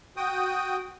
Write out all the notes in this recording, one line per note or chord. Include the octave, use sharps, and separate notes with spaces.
F#4 G5 D#6